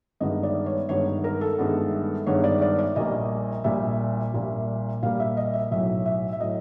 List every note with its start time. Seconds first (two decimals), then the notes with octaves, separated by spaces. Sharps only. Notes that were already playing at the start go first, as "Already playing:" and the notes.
0.20 G1 G2 D#3 G#3 B3 D#5
0.43 D5
0.66 C#5
0.89 G1 G2 D#3 G#3 B3 C#5
1.24 A#4
1.41 A4
1.58 G1 G2 D#3 G#3 B3
2.27 G1 G2 D#3 G#3 B3 C#5
2.44 D5
2.62 D5
2.79 D5
2.96 A#1 A#2 G3 A#3 D#5
3.64 A#1 A#2 G3 A#3 E5
4.34 A#1 A#2 G3 A#3
5.02 A#1 A#2 G3 A#3 F5
5.20 E5
5.37 D#5
5.53 E5
5.71 B1 A2 F#3 E5
6.06 E5
6.33 E5
6.40 A2 F#3 D#5